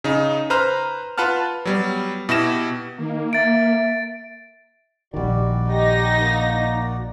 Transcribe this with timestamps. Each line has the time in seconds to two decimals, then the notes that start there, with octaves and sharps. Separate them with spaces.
0.04 C#3 D#4
0.50 B4 C5 A#5 F6
1.18 F4 B4 F#5 A5 F6
1.65 F#3 G3 B3
2.29 B2 E4 G4 A#6 E7
2.98 D#3 A#3
3.33 E5 A6 D7
5.14 A#1 D#3 G3 F#4 D5
5.70 D#4 G4 A#6
6.21 A#3